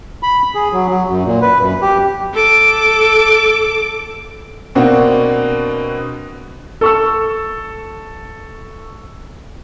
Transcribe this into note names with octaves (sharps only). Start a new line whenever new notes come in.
B5
G#4
F#3
F#3
F#2
A#2
B4
F#2
G4
A4 D6
B2 A#3 C4 D4 F#4
A4 C#6 E6